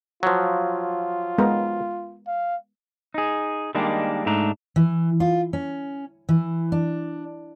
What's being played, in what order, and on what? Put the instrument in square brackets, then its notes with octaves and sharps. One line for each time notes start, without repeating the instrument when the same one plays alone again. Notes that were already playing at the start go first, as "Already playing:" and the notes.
[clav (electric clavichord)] F3 F#3 [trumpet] F4
[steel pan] G#3 B3 A#4
[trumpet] F5
[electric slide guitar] D#4 G#4
D#3 G3 G#3 A#3 D4
G#2 A3 D4 A#5
[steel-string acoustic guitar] E3
F4
C#4
E3
D4